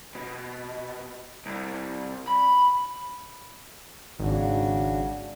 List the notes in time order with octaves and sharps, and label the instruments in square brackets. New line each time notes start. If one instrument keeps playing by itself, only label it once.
[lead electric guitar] B2
C2
B5
[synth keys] G#1 [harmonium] C#3 D4 F#4